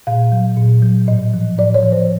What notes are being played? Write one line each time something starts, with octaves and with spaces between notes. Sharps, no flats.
A#2 F5
F#3
A#2
F#3
A2 D#5
F3
A2 D5
C#5
F3
C5